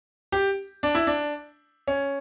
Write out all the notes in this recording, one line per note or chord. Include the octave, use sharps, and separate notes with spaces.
G4
D4
E4
D4
C#4